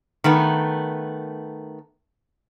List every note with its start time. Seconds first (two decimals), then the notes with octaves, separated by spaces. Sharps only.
0.24 D#3 A3 B3